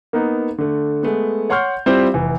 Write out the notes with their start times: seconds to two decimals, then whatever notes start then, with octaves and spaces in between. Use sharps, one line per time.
0.13 A#3 B3 D#4
0.58 D3 A3
1.03 G#3 A3 B3
1.50 C#5 F#5 C6 C#6 F6 G6
1.86 G3 C4 E4 F4 C5
2.14 F1 E3